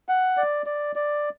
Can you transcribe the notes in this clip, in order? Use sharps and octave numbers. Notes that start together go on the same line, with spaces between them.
F#5
D5
D5
D5